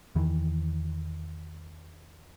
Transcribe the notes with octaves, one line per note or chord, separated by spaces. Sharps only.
E2 D#3 E3